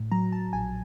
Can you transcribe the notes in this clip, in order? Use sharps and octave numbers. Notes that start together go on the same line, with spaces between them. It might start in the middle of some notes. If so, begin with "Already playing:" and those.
Already playing: A2
F#3 A#5
A5
A#1 G#5